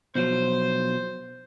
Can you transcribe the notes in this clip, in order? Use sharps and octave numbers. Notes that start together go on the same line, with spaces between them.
B2 F3 F#3 C5